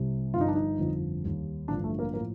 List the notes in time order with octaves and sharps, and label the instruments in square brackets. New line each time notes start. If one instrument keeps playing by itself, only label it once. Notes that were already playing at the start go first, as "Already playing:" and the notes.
Already playing: [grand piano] C2 C3 G3
G1 G2 F3 F4
D#4
D4
D#4
G1 F2 D3 F3
D#2 D#3 G3
A1 G2 D3 F3 D4
A3
A#3
A2 F3 A#3